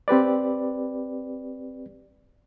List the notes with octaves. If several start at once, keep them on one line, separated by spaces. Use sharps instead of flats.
C4 G4 B4 D5